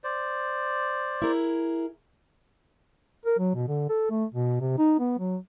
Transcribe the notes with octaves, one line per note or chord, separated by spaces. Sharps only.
C5 D5
E4 G#4 A#4
A#4
F#3
B2
D3
A4
A3
B2
C3
D#4
B3
F#3